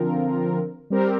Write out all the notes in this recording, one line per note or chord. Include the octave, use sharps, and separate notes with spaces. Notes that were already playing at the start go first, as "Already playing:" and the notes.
Already playing: D3 F3 C4 F4 A#4
G3 C4 G4 A#4